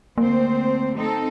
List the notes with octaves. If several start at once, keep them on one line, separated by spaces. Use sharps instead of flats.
D2 A#3 C4 C5
C4 D#4 A4